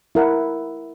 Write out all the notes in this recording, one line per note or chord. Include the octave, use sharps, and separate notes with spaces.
E4 A#4 F#5